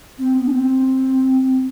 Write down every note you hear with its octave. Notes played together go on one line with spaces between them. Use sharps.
C4
B3
D4
C4